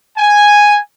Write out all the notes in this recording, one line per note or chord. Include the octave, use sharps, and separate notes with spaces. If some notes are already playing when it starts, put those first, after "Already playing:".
G#5